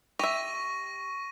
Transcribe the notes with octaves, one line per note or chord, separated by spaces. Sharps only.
G4 E5 C#6 A#6 D#7